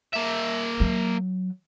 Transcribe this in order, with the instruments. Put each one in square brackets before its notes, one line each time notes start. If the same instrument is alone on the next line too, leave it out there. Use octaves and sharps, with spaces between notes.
[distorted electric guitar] A#3 E5
[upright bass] F#3